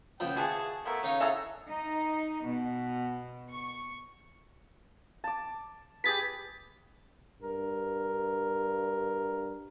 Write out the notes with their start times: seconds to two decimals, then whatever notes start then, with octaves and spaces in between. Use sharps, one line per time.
0.20 C#2 F3 B3 G5
0.36 C#3 E3 G3 F#4 G#4 F#5 A5
0.85 F3 A3 B3 E4 A#4
1.03 C#3 D#4 C#5
1.20 E4 G#4 A4 E5 F#5 A#5
1.69 D#4
2.47 B2
3.51 C#6
5.24 A5 D6
6.04 G4 G#4 B4 A6 B6
7.42 G2 A#4